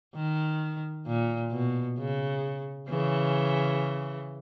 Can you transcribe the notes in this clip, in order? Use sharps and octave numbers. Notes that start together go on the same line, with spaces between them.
D#3
A#2
B2
C#3
C#3 E3